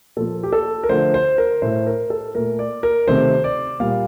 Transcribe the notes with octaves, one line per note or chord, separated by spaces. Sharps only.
A#2 F3 A#3 A4
G4
A4
A#4
D3 F3 A3 C5
C5
A#4
A2 A3 C5
A#4
A4
A#2 A3 A#4
D5
A#4
C3 D#3 A3 C5
D5
A#2 G3 A#3 F5